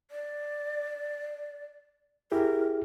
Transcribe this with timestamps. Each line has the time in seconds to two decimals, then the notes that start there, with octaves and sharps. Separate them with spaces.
0.11 D5
2.32 E4 G4 G#4 A#4